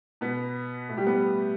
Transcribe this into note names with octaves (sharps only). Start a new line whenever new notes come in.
B2 B3
A2 A3
G3 G4
B3 B4